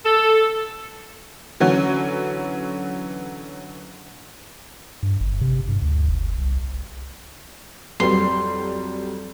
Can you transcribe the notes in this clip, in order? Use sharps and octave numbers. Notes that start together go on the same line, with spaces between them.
A4
D3 E3 F#3 C#4
G2
G1
C3
G2
D2
F#1
C2
F2 F#3 G3 C6